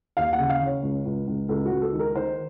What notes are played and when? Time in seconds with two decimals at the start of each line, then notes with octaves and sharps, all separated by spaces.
0.17 D#2 F5
0.33 F#5
0.39 C#3
0.49 F5
0.61 C#3
0.66 C#5
0.83 C#2
1.05 C#2
1.27 C#2
1.49 C#2 A4
1.65 F#4
1.72 C#2
1.82 A4
1.93 D#3
1.99 A#4
2.15 D#3 C5